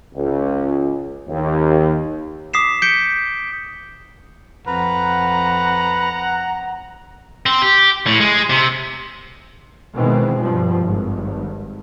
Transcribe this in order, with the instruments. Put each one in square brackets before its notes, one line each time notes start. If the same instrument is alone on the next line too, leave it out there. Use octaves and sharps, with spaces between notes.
[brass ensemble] C#2
D#2
[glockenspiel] D6 D#6 B6 C7 E7
G6 B6 C#7 D7 G7
[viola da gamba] F2 [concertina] B4 [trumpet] F#5 [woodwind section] A#5
[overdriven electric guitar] C4
G4
A2
G#3
C3
[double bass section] B2 D#3 E3 G#3 C4
G2 B2 F3
G#1 G2